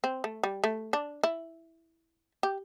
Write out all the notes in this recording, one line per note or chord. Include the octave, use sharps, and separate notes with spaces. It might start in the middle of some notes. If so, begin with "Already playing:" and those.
C4
A3
G3
A3
D4
E4
G4